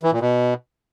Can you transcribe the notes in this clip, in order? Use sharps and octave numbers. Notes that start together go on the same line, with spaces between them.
E3
A#2
B2